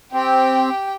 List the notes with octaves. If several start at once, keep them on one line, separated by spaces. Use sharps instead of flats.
C4 G4 G5